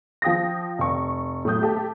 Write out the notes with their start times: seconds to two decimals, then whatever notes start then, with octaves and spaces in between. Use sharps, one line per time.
0.22 F3 G5 D#6 A#6
0.78 F1 C#6
1.45 A2 F#3 D#6 G6
1.61 A3 G4 A5